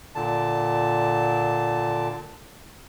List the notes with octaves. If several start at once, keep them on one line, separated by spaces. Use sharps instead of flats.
A#2 D3 A5